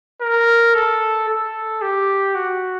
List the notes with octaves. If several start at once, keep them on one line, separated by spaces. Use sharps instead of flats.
A#4
A4
A4
G4
F#4